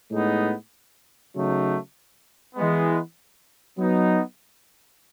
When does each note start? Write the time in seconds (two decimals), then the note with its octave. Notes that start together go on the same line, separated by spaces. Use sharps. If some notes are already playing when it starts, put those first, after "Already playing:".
0.10 A2 G#3 B3 D#4
1.33 C#3 F#3 A3 D#4
2.55 E3 G#3 B3
3.77 F#3 B3 D#4